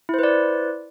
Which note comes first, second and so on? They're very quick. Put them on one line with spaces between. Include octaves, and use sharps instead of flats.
E4 C5 B4 D5